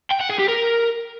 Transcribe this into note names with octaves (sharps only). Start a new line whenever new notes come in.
G5
F#5
G#4
G4
A#4